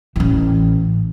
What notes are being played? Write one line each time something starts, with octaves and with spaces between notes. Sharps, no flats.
A1 E3